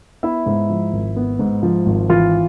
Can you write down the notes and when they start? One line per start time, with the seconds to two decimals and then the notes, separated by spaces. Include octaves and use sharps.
0.23 B3 E4 E5
0.46 G#2
0.70 F3
0.93 G#1
1.16 B3
1.39 G#2
1.63 F3
1.86 G#1
2.09 E3 F4 F5